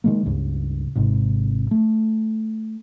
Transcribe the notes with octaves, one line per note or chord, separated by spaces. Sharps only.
D#3 G#3 A#3
C#2 G2 C#3
G#1 G#2 C3
A3